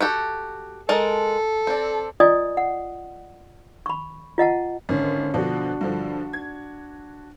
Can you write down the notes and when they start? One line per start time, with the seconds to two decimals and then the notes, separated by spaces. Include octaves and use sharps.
0.01 F#4 G4 A4
0.89 G#3 A4 A#4 A5
1.67 C4 D4
2.20 F4 D5 D#5 G#5 D#6
2.57 F#5
3.86 B5 C#6
4.38 F4 D#5 F#5 A5
4.89 G#1 D3 C#4
5.34 B2 D3 F3 D4 F#4
5.81 G2 D3 F3
6.33 G#6